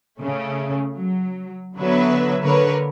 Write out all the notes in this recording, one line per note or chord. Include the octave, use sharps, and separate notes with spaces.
C#3 A3 C#4
F#3
D3 F#3 B3 B4 E5
D3 A#3 A#4 B4 C#5